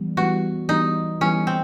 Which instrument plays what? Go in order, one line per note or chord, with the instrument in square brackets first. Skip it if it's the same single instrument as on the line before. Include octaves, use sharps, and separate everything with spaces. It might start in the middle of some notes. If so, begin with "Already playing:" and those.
Already playing: [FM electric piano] E3 G3 B3
[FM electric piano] E3 G3 B3 [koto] F#4
[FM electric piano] E3 G3 B3 [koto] D#4
[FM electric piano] E3 G3 B3 [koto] C#4
[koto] C4